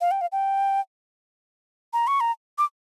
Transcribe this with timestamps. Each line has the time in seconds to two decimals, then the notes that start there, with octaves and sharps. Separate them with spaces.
0.01 F5
0.11 G5
0.21 F5
0.32 G5
1.93 A#5
2.07 C#6
2.20 A#5
2.58 D6